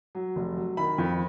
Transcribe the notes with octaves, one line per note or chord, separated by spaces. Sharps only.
F#3
F1
F#3
D#3 B5
F2